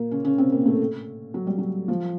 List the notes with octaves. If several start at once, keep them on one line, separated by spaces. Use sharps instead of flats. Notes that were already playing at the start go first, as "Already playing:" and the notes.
Already playing: A#2 A#3
C#3 C#4
C#3 C#4
C3 C4
A#2 A#3
A2 A3
F#3
G3
F#3
F3